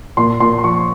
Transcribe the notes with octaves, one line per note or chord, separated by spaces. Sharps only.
A#2 C6
A#2 C6
C6
F3 C#6